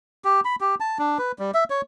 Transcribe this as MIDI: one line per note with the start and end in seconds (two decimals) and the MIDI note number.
0.25 0.41 67
0.45 0.56 83
0.61 0.75 67
0.80 0.98 81
0.99 1.18 62
1.19 1.32 71
1.39 1.51 55
1.54 1.64 76
1.70 1.81 73